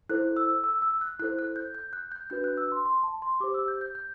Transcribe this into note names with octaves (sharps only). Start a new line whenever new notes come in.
E4 A4 C5 F#6
E6
E6
E6
F#6
E4 A4 C5 F#6
F#6
G6
G6
F#6
G6
D4 F#4 B4 G6
F#6
E6
C6
C6
A5
C6
G4 C5 D6
E6
G6
G6
G6